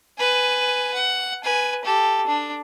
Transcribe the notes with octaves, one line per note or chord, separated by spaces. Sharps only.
B4 G#5
F#5
B4 G#5
G4 A4
D4